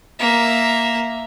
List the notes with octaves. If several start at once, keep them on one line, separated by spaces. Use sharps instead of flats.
A#3 E5